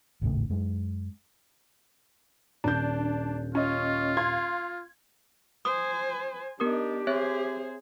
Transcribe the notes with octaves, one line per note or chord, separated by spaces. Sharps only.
G#1 D#2 A2 C#3
F#2 G#3
D#1 D4 G6
C#4 F4 D#5
F5 C6 G#6
C5 G#5 D#6
B3 D4 D#4 G4 A#4 D#6
C4 G#4 C5 C#5 E5